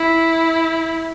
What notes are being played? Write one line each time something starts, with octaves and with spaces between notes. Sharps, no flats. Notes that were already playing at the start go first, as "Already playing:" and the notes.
Already playing: E4